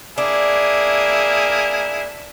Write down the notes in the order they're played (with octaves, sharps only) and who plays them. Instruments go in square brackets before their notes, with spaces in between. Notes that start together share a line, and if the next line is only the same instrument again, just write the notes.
[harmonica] A#3 E4 G#4 [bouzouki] D4